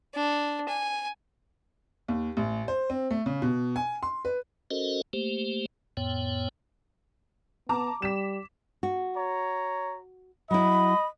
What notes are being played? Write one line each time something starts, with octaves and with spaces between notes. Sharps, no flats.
D4
G#5
D#2
A1
C5
C4
A3
C#3
B2
G#5
C6
B4
C#4 F#4 A4 A#4 C5 D#5
A3 A#3 G4 C5
F2 A2 B3 C#5 G5
B3 A5 A#5 D6
G3 B6 E7
F#4
C#5 A#5
F#3 E4 D#5 B5